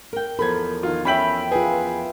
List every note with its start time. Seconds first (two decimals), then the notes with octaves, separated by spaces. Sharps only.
0.13 A#4 G5
0.39 E2 F3 A4 A#4 B5 G#6
0.83 D#3 F4
1.05 C#4 E5 G5 B5 B6 F#7
1.52 F4 G#4 B4